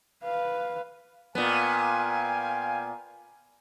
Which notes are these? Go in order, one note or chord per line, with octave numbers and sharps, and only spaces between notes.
B4 F5
A#2 B3 F5 G5 G#5